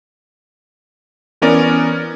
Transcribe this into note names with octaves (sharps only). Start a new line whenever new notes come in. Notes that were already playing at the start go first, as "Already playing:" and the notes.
E3 B3 C#4 A#4 D5